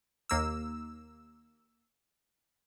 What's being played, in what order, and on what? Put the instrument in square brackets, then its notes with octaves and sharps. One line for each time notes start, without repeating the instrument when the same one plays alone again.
[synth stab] D#2 A#3 E6